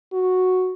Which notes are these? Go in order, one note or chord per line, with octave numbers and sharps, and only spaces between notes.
F#4